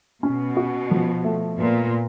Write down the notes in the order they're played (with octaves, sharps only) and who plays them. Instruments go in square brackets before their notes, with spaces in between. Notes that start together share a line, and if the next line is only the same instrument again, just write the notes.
[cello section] B2 [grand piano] C#4
[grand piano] F#4
F3
A3
[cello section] A#2 [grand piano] B3